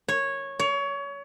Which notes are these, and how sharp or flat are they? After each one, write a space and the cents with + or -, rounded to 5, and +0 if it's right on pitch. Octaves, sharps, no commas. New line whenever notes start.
C#5 -10
C#5 +25